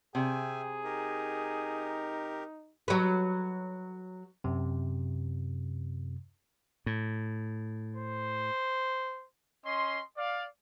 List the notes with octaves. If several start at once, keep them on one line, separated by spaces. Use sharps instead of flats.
C3 G#4 E5 G5 G#5
D#4 G4 A#4
F#3 B4
F#2 C3
A2
C5
C#4 D#5 C6
D5 F5